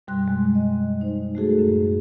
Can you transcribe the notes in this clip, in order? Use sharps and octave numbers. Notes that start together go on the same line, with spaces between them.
F#2 B2 G3 C6 F#6
G#3
D#5
D#4 C5
A3 F#4 G#4 A4
F#2 A2